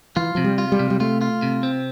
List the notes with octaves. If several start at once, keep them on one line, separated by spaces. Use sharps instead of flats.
E3 F4
C3 F3
G3
F4
G3
C3
G3
A3 F4
F4
C3
C4